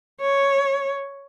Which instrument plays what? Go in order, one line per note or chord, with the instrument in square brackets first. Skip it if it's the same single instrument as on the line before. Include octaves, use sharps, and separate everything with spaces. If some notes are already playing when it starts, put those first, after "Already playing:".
[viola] C#5